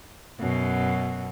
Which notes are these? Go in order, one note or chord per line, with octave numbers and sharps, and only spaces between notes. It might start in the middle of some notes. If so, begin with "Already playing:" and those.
F#2 B2